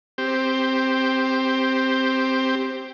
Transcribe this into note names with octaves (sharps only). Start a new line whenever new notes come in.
C4 G4